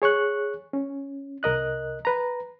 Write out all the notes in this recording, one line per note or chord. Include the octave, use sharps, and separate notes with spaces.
G#4 C#5 C#6 F#6
C#4
C2 A#4 D#5 F#6
B4 A#5